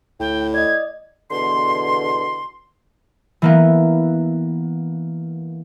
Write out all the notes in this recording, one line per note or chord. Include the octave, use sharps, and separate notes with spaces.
D2 A2 G5
D5 D#5 G#6
E2 B2 D3 C6
E3 A#3 B3